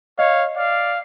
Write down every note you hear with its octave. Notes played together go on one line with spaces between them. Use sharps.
C#5 D#5 F5
D5 F5